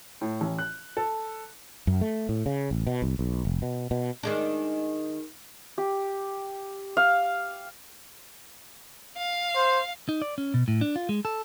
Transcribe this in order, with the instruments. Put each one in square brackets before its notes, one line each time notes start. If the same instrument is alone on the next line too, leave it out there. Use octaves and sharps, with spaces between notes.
[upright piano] A2
A1
F#6
A4
[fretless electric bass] F#2
A3
A2
C#3
A1
B2
C2
B1
F1
B2
B2
[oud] D#3 G#3 D4
[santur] G4
F5
[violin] F5
[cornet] C5
[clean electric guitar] D#4
D5
C#4
B2
A2
D4
F4
G#3
A4